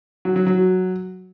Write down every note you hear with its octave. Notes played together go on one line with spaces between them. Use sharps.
F#3
F#3
F#3